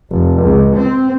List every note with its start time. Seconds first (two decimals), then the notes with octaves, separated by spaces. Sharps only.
0.11 F1
0.42 C#2
0.76 C4